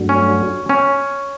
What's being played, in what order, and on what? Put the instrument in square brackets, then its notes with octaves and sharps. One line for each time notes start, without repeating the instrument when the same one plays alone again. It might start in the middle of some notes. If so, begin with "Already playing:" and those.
Already playing: [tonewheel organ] G2 F#3 A3 D4 F#4
[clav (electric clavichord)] C#4
C#4